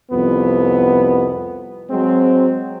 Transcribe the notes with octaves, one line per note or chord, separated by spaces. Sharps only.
C2 F2 B3
F#3 G#3 C4